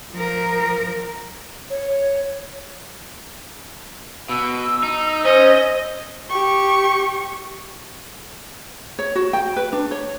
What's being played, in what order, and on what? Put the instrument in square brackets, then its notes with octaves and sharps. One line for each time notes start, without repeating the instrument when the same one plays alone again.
[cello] F3 A#4
[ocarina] C#5
[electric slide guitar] B2 [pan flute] E6
[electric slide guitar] D#4
[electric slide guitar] C#4 [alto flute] C5 [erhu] D#5
[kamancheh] G4 C#6
[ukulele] C#5
F#4
G5
B4
D4
C#5